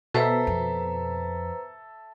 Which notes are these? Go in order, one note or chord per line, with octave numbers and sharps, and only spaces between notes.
B2 A4 B4 C5 E5 A#5
F2